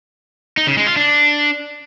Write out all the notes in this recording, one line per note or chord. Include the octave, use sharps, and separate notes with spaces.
D#4
C#3
G#3
F4
D4